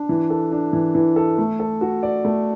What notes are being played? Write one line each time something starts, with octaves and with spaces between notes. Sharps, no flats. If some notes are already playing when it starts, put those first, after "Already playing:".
Already playing: D4
E3
A4
D4
E3
E3
A4
A3
A4
F#4
D5
A3